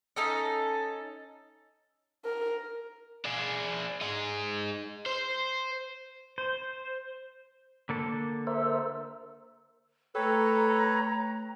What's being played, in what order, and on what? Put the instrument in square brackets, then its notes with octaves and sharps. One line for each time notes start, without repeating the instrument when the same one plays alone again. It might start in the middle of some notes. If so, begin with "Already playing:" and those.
[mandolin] C#4 D#4 A4 D#5
[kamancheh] A#4
[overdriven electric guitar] D4 G#4
D#4 G#4
C5
[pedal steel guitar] C5
[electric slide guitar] D3 A#3 A4
[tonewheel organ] A#4 C5 E5
[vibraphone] A3 G5 [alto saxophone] A4 [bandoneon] B4 C#5 [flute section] A#5